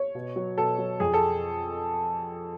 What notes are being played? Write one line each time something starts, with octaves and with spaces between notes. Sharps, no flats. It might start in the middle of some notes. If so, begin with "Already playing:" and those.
Already playing: C#5
B2
F#3
B2 A4
F#3
F2 G#4
A4